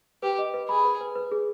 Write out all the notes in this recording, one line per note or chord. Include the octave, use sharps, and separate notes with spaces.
G4 B4
D#5
B4
G#4 B5
B4
B4
B4
G#4